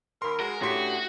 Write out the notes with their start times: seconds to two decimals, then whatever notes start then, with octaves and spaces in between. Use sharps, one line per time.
0.22 D#2 A#4 B5 C6
0.40 G#3 F#4 A#4
0.62 A2 C#4 D4 F#4 G4 C6 B6